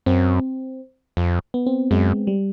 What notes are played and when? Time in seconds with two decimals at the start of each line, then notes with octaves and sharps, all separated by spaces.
0.06 F#2 C4
1.17 F2
1.54 B3
1.66 C4
1.91 F#2 G#3
2.27 G3